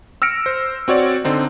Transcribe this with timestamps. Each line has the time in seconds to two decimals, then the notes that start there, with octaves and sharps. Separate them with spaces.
0.22 E6 F6 A#6 C#7 D7
0.46 C5
0.88 C4 F#4 C#5 D5
1.25 D3 C4 D#4